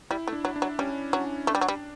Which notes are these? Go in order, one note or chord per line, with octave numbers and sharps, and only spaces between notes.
G3 E4
A3
D4
F#3
D4
F#3
G3 C#4
F#3 C#4
A3 D4
G3
F#3
G3